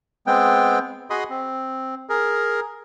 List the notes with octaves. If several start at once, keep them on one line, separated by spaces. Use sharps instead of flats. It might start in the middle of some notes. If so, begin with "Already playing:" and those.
G#3 B3 C4 G5
F#4 G#4 D#5 B5 C6 D#6
C4
G#4 A#4